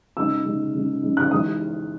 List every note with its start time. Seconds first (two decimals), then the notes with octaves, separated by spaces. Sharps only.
0.17 C#3 G#3 D#4 E6
0.45 C#3 G#3 D#4
0.74 C#3 G#3 D#4
1.02 C#3 G#3 D#4
1.17 F#6
1.31 E3 G#3 D#4 D#6